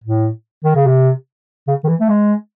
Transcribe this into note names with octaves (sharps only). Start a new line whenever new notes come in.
A2
D#3
C#3
C3
C#3
D#3
E3
A3
G#3